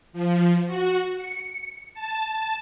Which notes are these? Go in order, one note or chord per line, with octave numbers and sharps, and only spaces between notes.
F3
F#4
C#7
A5